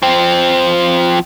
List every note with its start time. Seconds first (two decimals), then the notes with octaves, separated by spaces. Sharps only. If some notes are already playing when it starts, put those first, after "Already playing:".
0.02 F3 C4